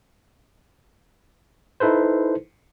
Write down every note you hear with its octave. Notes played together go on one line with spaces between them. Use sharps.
D#4 E4 A4 B4 C5